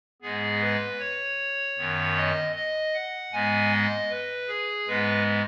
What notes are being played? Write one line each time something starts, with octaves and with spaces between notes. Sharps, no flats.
G#2 G#3 B3 G#4
B4
C#5
F#2 D#3 B3
D#5
D#5
F#5
G#2 G#3 B3 G#5
D#5
B4
G#4
G#2 G#3 B3 B4